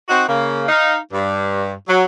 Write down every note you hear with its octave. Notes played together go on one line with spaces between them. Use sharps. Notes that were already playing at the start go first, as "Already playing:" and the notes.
C4 D#4 F#4
C#3 A#3
D#4 F5
G2
F#3